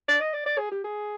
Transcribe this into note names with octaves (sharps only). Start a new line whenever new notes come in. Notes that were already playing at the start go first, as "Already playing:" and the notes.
D5
D#5
D5
D5
G#4
G4
G#4